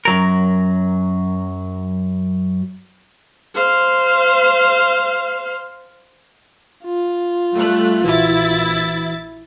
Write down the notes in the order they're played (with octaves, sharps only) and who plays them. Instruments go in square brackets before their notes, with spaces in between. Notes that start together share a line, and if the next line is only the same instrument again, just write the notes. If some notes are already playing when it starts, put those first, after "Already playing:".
[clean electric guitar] F#2 F#3 A#4
[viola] C5 F5
[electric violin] F4
[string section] G3 A3 F#6
[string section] A#1 E4 A6 [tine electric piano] E3 F#4